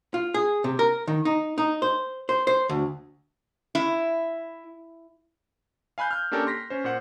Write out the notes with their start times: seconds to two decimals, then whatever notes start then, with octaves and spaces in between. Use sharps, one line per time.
0.14 F4
0.34 G#4
0.64 C3
0.79 A#4
1.08 D#3
1.25 D#4
1.58 D#4
1.82 C5
2.29 C5
2.47 C5
2.69 D2
3.75 E4
5.98 F5 G#5 B5 F#6 G6
6.11 F6 G6
6.32 A#3 C#4 D4 G4 A4 A#4
6.47 C6 A#6 B6
6.70 C#4 C5
6.84 A#2 C5 F#5